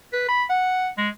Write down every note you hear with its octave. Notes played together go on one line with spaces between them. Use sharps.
B4
B5
F#5
G#3